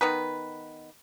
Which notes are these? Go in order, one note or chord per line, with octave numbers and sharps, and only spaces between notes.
D#3 B3 B4